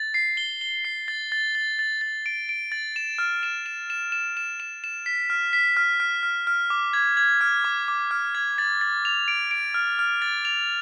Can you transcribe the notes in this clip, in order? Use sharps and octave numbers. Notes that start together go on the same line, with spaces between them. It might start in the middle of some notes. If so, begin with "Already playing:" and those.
Already playing: A6
C7
G7
G7
C7
A6
A6
A6
A6
A6
D7
D7
A6
E7
F6
E7
E7
E7
E7
E7
E7
E7
B6
F6
B6
F6
F6
F6
F6
D6
G#6
G#6
F6
D6
D6
F6
G#6
A6
A6
F7
D7
D7
F6
F6
A6
F7